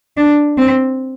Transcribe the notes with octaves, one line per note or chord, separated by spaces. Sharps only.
D4
C4